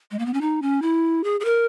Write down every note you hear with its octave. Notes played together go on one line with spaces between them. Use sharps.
G#3
A#3
B3
C#4
D#4
C#4
E4
G#4
G#4
A#4